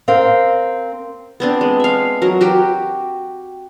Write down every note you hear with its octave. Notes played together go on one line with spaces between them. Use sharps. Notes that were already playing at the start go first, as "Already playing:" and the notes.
C4 A#4 F5
B3 C4 D4
G#3
E5 F5
F#3 A#4
F#4 G4 G5